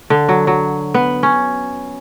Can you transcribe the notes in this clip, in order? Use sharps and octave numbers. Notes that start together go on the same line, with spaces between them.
D3
F#3
F#3
B3
C#4